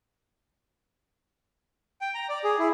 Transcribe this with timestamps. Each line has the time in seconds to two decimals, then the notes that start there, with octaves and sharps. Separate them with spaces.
2.01 G5
2.14 A#5
2.29 D5
2.44 G#4
2.59 E4